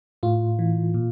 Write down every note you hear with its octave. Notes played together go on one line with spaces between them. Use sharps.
A2 F4
E3
A#2